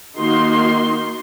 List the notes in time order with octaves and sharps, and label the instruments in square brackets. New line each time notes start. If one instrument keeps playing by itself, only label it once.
[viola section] D#3 A#3 D#4 F#4 C6